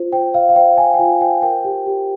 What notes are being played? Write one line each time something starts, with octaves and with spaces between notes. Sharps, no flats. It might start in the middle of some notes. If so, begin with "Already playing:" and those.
Already playing: F4 C5
C5 G5
C5 F5
F5
C5 G5
C5 G#5
G5
F4 G#5
C5 G5
A#4 G5
G4
G4